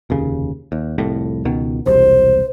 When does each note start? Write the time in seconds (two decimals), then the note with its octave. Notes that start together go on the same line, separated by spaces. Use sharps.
0.10 F1 D#2 C#3
0.72 D#2
0.98 C2 F2 A2
1.45 C#2 B2 D#3
1.86 E1 C2 C5